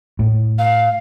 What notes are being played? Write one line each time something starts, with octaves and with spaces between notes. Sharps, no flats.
A2
F5